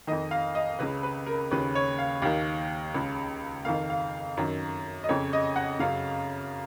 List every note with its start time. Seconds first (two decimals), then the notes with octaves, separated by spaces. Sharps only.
0.07 F2 D#3 D#5
0.31 F5
0.55 D#5
0.79 C#2 C#3 B4
1.03 B4
1.26 A#4
1.51 D#2 C#3 B4
1.75 C#5
1.99 F5
2.22 D#2 D#3 F5
2.94 C#2 C#3
3.65 F2 D#3 F5
3.90 F5
4.37 F#2 D#3
5.04 D#5
5.09 F2 C#3 C#5
5.33 D#5
5.56 F#5
5.79 F#2 C#3 F5